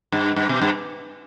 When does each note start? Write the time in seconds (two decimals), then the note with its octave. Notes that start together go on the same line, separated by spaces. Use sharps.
0.12 G2
0.36 G2
0.49 B2
0.61 G2